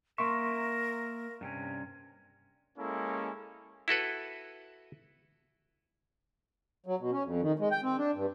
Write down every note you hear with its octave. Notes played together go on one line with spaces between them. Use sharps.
A#3 A#4 E5 C6 C#6
G2 C3 C#4
G#3 A#3 C#4 E4 A4
E4 F#4 A4 B4
F#3
B2
C#4
F2
D#3
G#3
G5
C4
D4
G2